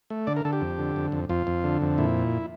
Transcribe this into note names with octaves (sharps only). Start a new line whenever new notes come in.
A3
D3 D5
A#4
D3 A4
G4
F2
D3
F2
F2
F2 F4
F2
D3
F2
A#2 E4